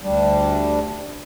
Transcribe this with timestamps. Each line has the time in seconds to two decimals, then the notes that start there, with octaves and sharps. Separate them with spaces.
0.03 D2 G3 D4